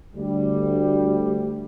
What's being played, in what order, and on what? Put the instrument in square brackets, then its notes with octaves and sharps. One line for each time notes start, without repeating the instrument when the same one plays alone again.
[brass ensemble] D2 G3